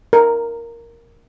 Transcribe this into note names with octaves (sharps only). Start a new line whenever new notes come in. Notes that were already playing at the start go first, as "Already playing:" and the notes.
A#4